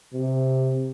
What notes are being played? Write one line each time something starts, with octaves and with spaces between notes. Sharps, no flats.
C3